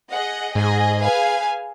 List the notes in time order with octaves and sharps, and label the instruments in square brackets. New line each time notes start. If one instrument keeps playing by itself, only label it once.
[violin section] G#4 D#5 F#5
[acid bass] G#2 [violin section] G#4 D#5 G#5
[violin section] G#4 B4 F5 G#5